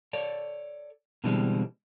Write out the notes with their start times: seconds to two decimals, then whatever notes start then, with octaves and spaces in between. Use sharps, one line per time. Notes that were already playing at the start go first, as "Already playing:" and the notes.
0.13 A4 C#5 D5
1.24 B2 D3 E3 G3 G#3 C4